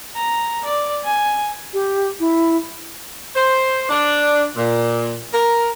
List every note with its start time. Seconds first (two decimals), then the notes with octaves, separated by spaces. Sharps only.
0.16 A#5
0.65 D5
1.04 G#5
1.73 G4
2.20 E4
3.35 C5
3.89 D4
4.55 A#2
5.33 A#4